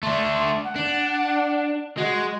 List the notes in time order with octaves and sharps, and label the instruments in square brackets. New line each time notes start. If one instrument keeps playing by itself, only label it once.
[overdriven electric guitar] A3 D4 [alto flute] C6
[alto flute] F#5
[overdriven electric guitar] D4
[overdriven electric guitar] G#3 [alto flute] F#4